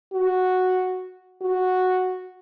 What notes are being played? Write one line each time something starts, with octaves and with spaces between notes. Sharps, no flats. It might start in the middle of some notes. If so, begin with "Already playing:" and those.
F#4
F#4